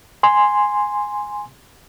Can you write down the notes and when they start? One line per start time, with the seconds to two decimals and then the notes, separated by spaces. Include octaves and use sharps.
0.23 G#5 C6